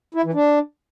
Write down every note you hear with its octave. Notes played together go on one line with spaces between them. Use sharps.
E4
E3
D4